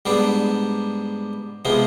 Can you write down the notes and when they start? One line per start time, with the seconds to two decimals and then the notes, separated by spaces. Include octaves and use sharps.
0.06 G#2 G3 B3 D4
1.65 C3 F3 G#3 B3